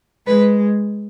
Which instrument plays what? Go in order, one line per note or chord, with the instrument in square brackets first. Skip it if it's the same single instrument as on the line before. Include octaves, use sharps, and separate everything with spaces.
[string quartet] G#3 B4